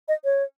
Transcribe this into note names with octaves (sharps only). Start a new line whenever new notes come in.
D#5
C#5